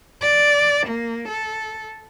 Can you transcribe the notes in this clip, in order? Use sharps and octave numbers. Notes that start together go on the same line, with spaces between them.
D5
A#3
A4